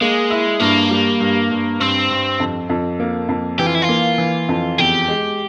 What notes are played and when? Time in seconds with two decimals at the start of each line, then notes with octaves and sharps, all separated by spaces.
0.01 G#3 A#3
0.30 E4
0.60 G2 A#3
0.91 G3
1.20 G2
1.51 G2
1.80 G2 C4
2.09 G2
2.40 F2
2.69 F2
3.00 A#3
3.29 F2
3.59 E3 G4
3.66 F4
3.75 E4
3.82 F4
3.89 A#3
4.18 E3
4.49 F2
4.78 E2 G4
5.08 G#3